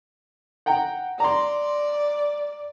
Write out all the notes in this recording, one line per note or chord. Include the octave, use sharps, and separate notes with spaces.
F#5 G5 A#5
D5 A#5 C6